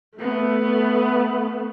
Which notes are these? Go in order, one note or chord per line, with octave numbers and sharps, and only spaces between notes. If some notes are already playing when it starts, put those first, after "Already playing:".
A3 B3